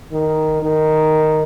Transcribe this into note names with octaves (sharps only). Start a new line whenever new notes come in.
D#3
D#3